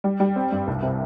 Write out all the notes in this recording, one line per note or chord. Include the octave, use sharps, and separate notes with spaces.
G3
G3
C4
G2
C2
C3